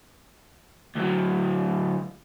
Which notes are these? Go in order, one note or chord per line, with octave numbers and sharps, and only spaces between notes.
D2 F#3